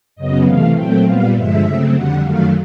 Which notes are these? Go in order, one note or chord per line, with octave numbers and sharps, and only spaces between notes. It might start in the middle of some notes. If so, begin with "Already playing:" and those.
F#2 C#3 F#3 B3 D#5
C3 E3 A3 F5
A#2 F#3 A3 C4 G5
A#2 G3 B3 F5
G2 D3 F3 G#3 E5
C#3 F#3 A3 C4
F2 D3 G3 F#5
F#2 D#3 F#3 A3 F5